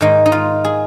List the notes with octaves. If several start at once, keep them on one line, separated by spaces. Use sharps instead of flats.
G#2 D#3 A#3 D#4
D#4
F4
G#4